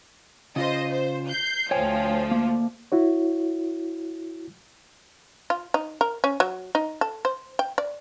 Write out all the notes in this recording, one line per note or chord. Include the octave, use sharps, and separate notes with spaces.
C#3 F4 C5 D#5
C5
G6 C7
D2 F3 C#5 G5 G#5
A#3
E4 F#4 C#5
F4
D#4
A#4
C#4
F#3
D#4
A4
C5
G5
D5